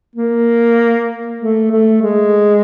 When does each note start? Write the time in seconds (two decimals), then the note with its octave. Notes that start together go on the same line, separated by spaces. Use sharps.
0.16 A#3
1.40 A3
1.71 A3
2.01 G#3